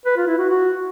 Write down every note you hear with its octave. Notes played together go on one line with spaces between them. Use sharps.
B4
F4
E4
F#4
F#4